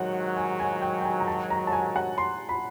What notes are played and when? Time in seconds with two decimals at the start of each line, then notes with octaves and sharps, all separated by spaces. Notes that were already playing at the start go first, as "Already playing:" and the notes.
Already playing: G#2 D#3 F#3 F#5
0.37 G#5
0.60 G#5
0.82 G5
1.01 G5
1.05 G#5
1.20 A#5
1.27 A5
1.50 A#5
1.67 A5
1.73 G#5
1.96 F#5
2.18 C6
2.49 B5